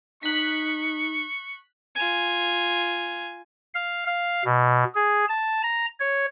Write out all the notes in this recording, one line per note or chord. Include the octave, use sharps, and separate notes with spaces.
D#4 C#6 F#6 B6
F4 G#5
F5
F5
B2
G#4
A5
A#5
C#5